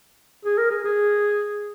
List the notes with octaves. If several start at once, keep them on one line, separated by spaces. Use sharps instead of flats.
G#4
A#4
G#4
G#4